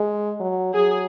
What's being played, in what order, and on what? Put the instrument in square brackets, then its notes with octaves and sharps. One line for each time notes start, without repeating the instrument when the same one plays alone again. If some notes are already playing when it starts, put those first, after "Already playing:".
Already playing: [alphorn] G#3
F#3
[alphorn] F#3 [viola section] G#4